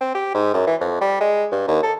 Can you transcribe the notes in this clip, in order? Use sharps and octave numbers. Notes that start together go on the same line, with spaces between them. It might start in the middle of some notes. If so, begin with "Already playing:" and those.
C4
G4
G#2
F#2
E3
F2
G3
G#3
G2
D#2
A4